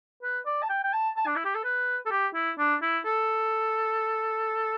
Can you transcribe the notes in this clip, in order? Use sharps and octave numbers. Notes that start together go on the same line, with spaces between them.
B4
D5
A5
G5
G5
A5
A5
D4
E4
G4
A4
B4
A4
G4
E4
D4
E4
A4